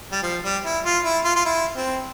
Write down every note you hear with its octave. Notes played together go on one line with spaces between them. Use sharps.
G3
F3
G3
E4
F4
E4
F4
F4
E4
C4